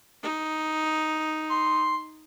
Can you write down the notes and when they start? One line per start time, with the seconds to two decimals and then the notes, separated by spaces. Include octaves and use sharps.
0.23 D#4
1.49 C6